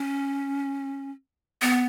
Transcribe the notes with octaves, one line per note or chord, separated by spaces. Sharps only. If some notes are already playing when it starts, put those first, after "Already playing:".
Already playing: C#4
B3